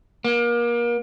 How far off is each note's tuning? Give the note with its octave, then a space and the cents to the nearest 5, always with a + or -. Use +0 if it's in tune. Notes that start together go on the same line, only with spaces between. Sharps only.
A#3 +30